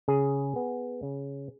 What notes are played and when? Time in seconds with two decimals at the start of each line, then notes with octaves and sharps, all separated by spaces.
0.08 C#3 G#4
0.56 B3
1.03 C#3